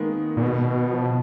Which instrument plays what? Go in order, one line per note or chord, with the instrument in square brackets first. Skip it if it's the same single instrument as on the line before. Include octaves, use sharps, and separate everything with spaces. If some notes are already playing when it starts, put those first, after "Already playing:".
Already playing: [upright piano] D#3 G#3 A#3 B3
[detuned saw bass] A#2
B2
[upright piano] F3